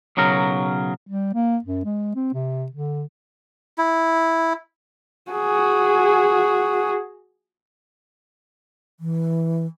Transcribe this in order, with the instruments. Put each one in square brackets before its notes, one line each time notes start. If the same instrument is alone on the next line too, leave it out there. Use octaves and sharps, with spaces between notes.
[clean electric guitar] B1 C#3 F#3 A#4
[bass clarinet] G3
A#3
F#2
G#3
C4
C3
D3
[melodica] E4
[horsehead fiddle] F#4 G#4
[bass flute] E3